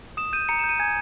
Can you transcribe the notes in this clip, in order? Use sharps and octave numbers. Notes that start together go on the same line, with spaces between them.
D#6 E7
G6 D#7
A#5 C#7
E7
G6
D#7
G#5 G#6